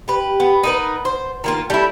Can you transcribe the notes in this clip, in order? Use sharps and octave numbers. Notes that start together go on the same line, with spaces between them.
G4 B4
B3
D#4 A#4 B4
C5
D#3 A#3 F4
G3 A3 E4